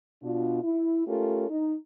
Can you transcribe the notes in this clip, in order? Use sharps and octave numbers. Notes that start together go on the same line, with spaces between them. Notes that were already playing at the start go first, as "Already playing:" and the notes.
B2 D4 F4
E4
A3 C#4 F4 G4 A4 A#4
D#4